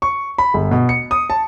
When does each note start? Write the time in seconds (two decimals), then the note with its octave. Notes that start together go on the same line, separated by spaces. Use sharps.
0.02 C#6
0.38 B5
0.54 G1
0.71 B2
0.89 C#7
1.11 D#6
1.30 A5